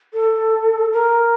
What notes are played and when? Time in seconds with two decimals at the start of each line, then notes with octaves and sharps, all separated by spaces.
0.13 A4
0.93 A#4